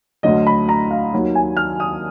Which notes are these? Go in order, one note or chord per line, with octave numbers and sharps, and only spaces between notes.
D2 D3 F#3 D#5
B5
A#5
F5
D#2 D#3 F#3
G#5
F6
D#6